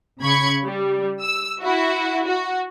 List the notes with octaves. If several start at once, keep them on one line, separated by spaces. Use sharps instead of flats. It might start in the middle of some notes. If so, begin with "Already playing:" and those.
C#3 B5 C#6 G#6 C#7
G3
E6
E4 F#4
F#4